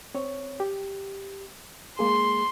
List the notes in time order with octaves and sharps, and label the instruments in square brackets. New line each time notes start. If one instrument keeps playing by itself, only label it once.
[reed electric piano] C4 C#5
G4
[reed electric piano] G#3 A#3 G#4 [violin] C6